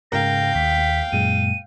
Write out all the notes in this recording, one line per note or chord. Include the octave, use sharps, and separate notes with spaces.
G#2 C#3 A#4 F5 G5 A#6
D#2 B6
F#2 A#2 G#3 D#7